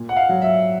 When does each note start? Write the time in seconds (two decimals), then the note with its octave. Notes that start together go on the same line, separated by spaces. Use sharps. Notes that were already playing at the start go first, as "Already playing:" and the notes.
Already playing: A#2
0.09 F#5
0.17 F5
0.29 F#3
0.42 E5